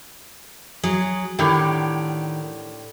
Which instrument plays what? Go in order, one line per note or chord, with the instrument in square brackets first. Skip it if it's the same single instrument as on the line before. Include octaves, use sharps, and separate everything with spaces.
[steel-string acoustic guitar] F#3 [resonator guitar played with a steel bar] G#4
[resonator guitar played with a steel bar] A2 D3 G4 [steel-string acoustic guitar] D#3